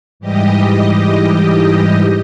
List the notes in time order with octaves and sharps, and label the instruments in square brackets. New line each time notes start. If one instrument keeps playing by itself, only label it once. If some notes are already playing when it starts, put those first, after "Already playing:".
[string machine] G#2 E3 G3 G4 D#5